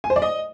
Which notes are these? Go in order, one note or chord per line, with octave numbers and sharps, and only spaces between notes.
G#5
C5
D5
D#5